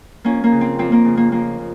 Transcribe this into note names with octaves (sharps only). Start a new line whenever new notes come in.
F2 A#3 C#4
A#3
C#3
C4
F2 C4
A#3
C#3
A#3
F2 A#3
C#3